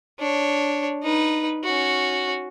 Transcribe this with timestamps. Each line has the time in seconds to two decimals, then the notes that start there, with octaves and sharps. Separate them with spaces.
0.19 D4 C#5
1.03 D#4 B4
1.64 C#4 F#4